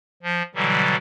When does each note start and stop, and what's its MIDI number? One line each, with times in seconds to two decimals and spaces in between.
0.23 0.42 53
0.55 0.96 47
0.55 0.96 50
0.55 0.96 52
0.55 0.96 54
0.55 0.96 55